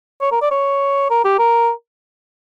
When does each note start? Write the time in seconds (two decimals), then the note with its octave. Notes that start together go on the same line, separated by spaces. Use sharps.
0.21 C#5
0.32 A#4
0.41 D5
0.51 C#5
1.10 A#4
1.25 G4
1.39 A#4